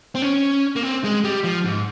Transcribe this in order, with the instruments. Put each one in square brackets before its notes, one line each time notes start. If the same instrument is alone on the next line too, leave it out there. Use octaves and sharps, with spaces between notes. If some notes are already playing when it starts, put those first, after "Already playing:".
[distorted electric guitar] C4
C#4
A#3
C4
G#3
G3
F3
G#2